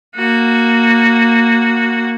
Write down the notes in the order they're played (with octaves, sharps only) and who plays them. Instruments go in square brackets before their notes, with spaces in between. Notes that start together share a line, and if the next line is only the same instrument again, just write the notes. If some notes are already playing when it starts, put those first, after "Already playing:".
[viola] A#3 F#4